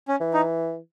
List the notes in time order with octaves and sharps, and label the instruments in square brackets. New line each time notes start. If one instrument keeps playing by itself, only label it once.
[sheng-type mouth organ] C#4
[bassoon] E3
[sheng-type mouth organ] D#4